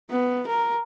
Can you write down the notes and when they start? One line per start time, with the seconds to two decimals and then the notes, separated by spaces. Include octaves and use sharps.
0.10 B3
0.47 A#4